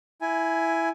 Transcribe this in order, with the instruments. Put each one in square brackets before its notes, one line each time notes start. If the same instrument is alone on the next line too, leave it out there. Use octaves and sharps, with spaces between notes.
[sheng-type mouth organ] E4 G#5